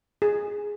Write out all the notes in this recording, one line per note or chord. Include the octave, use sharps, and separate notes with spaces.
G#4